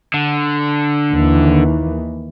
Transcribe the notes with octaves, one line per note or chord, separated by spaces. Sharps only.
D3
D#2 D#3 E3